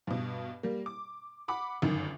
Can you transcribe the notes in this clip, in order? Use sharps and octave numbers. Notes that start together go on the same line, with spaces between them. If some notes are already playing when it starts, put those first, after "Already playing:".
G2 B2
G3 A#3
D6
F#5 B5 D6
G1 F#2 D#3